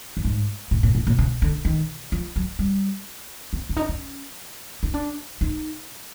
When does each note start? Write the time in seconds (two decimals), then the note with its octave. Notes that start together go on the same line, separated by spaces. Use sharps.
0.17 G2
0.25 G#2
0.71 A2
0.83 A#2
0.95 A2
1.07 A#2
1.19 C#3
1.42 D3
1.65 D#3
2.12 F3
2.36 F#3
2.59 G3
3.53 C4
3.69 D4
3.77 D#4
3.89 C#4
4.83 D#4
4.94 D4
5.41 D#4